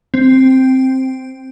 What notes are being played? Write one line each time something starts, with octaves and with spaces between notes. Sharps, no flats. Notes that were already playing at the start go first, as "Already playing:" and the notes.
C4